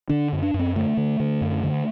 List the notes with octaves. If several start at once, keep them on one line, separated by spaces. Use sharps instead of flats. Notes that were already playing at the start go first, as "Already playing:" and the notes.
D3 D4
F#2
D4
F#2
C4
D3 A3
D3
D3
F#2
D3